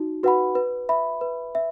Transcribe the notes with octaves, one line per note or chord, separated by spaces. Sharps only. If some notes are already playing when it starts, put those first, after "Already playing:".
Already playing: D#4 F#4
F#4 B4 F#5 B5
B4
E5 B5
B4
E5